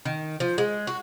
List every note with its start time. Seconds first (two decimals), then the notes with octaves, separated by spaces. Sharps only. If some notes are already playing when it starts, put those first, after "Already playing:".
0.05 D#3
0.40 F3
0.58 G#3
0.87 F#4